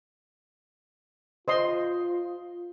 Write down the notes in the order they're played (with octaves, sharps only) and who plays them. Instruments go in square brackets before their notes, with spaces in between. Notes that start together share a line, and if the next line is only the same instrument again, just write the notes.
[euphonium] F4 [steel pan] C5 D#5 C6